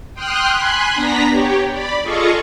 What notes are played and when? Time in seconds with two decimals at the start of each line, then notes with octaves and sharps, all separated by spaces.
0.14 G5 C6 D#6 F6 F#6
0.51 G#5 B5 C6 F#6
0.94 B3 D4 A#5 A#6 B6
1.29 G4 C#5
1.71 D5 B5
2.03 F4 G#4 A4 D#5 F5 C#6